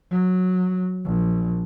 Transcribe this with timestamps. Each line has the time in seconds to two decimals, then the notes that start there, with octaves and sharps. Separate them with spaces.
0.11 F#3
1.05 A#1